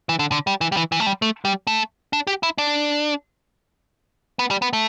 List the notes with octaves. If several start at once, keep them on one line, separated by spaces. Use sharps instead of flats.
E3
D3
D3
G3
E3
G3
E3
E3
A3
G3
A3
G3
A3
D4
G4
E4
D4
B3
G3
B3
A3